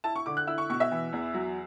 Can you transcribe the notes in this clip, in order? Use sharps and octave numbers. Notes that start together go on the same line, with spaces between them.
E4 A5
C#6
D3 D6
F#6
E4 E6
C#6
B2 C#6
E5
E3
E2
F#3